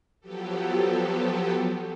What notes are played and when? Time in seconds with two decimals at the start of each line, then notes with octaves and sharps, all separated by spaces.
0.20 F3 F#3 B3 G4 A4